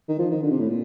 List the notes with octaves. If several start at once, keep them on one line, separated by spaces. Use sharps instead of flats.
D#3
F3
D#3
D3
C3
A2
A#2